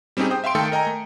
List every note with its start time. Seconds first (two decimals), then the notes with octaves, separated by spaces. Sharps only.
0.17 G3 C4 C#4 D#4 G4 G#4
0.30 C5 G5 D#6
0.44 E5 F5 G5 C6 D7
0.55 D#3 A3 A4 G5 C#7
0.72 A#4 D#5 G5 G#5 A#5
0.87 A3